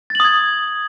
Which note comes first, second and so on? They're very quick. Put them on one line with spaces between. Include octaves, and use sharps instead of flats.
A6 F#7 D#6 G#6